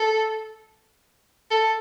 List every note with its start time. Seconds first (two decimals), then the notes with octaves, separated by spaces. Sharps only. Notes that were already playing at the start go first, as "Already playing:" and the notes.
Already playing: A4
1.51 A4